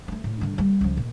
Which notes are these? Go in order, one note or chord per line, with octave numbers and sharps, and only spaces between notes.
A3 A#3
A2
G2 D3
G3 A#3
C#2 F3
A#2